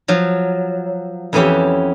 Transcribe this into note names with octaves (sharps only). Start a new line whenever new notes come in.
F3 F#3
F2 E3 B3 C#4 G4 E5